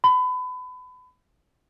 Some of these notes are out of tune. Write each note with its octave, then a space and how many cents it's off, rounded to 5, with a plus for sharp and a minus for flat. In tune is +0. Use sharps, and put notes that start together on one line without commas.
B5 +30